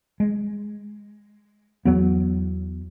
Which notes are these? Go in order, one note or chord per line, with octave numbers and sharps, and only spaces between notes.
G#3
E2 F#3 B3